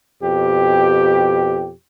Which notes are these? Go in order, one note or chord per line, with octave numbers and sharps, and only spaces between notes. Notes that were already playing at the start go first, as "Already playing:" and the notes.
F2 B2 G4